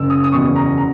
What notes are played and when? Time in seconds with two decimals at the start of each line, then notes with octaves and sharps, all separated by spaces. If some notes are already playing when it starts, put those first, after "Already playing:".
Already playing: F#1 E6
0.10 D#6
0.24 D#6
0.32 E2 B2 C#6
0.56 A#5
0.78 A#5